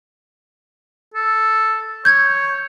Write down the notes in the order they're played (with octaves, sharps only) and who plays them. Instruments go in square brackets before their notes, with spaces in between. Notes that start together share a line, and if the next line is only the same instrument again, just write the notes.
[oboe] A4
[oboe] C#5 [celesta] G6 G#6